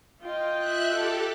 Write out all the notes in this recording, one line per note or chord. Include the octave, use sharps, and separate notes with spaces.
F4 D#5 G5
E5 F#6
G4 A4